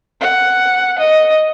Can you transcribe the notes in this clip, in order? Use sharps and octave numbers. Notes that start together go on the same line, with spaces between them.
F#5
D#5